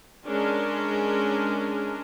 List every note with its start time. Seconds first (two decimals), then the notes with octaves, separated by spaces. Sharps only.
0.26 G#3 C#4 D4 A#4